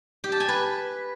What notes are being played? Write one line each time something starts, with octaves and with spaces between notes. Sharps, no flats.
G4
A5
G#5
B4